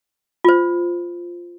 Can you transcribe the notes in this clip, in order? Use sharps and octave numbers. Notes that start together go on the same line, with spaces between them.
F4 C5